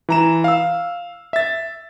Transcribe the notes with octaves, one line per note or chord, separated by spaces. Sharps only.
E3 A#5 E7
F5 E6
E5 A6